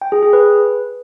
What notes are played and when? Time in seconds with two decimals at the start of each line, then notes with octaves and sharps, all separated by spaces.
0.02 G5
0.12 G#4
0.23 G#4
0.33 B4